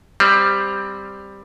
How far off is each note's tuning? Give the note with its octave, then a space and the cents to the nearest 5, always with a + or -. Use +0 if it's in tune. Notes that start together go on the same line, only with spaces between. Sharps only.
G3 +10 C4 +0